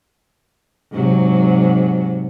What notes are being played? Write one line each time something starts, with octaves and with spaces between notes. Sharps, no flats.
G#2 C3 F#3